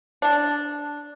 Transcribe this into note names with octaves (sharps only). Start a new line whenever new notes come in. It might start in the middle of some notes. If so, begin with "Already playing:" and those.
D4